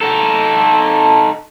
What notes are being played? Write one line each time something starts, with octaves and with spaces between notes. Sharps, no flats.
D#4 A4